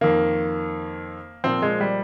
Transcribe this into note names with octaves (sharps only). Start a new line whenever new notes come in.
F2 D#3 A#3
A#2 F3 C4
G#3
G3